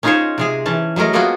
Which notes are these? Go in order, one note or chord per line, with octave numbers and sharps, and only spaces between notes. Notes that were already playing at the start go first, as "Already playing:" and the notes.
C#4 D#4 F4 G#4 C5 C#5
C3 G#3 G#4
E3 C#4 A5
F#3 G#3 A3 A#4 D#5
G3 A#3 B3 F4 F#4 G#4